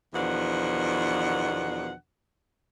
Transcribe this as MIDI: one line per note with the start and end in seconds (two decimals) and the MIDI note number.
0.14 1.92 40
0.14 1.92 47
0.14 1.92 51
0.14 1.92 53
0.14 1.92 62
0.14 1.92 78